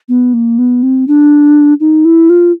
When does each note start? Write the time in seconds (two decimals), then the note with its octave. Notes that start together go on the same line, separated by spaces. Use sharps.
0.09 B3
0.33 A#3
0.58 B3
0.83 C4
1.08 D4
1.80 D#4
2.05 E4
2.29 F4